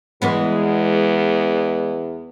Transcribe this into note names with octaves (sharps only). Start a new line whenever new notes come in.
E2 E3 G#3 B3